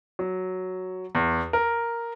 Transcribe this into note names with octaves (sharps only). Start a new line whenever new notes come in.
F#3
E2
A#4